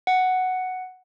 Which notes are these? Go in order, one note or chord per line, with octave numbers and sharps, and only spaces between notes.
F#5